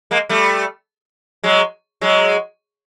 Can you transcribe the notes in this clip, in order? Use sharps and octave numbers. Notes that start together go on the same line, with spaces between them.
G#3 A#3
G3 A3
F#3 G#3
F#3 G#3